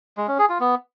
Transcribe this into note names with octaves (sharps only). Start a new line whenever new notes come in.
G#3
C#4
G#4
F4
B3